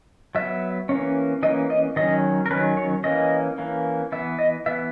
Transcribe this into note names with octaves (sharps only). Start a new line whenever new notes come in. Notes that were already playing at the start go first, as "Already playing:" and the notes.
F#3 B3 E5
E3 A#3 C#4
E3 A#3 C#4 D#5
D#5
D#3 F#3 C#4 D#5
A#4
D#3 F#3 C#4 B4
C#5
E3 A#3 C#4 D#5
E3 A#3 C#4
E3 B3 E5
D#5
E3 B3 E5